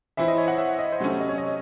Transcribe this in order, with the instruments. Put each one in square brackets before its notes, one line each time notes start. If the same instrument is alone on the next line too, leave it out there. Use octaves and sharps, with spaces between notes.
[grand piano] E3 C4 E4 [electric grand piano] E5
[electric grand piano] D#5
C#5
F#5
E5
D#5
C5
[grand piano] C3 F#3 A3 C#4 [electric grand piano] C#5
[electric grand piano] D#5
C#5
D#5